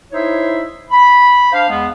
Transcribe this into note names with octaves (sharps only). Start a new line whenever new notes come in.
D#4 E4 C5 C#5 E5
B5
D4 C5 F5
E2 G#3 B3